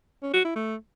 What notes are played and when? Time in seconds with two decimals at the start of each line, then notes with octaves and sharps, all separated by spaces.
0.22 C#4
0.34 F#4
0.45 E4
0.56 A3